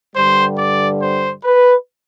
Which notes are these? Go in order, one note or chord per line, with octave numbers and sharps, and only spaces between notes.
G2 D3 G3 C5
D5
C5
B4